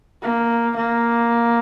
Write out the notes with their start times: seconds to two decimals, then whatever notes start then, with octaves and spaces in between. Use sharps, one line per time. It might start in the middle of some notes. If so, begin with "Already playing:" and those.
0.22 A#3
0.76 A#3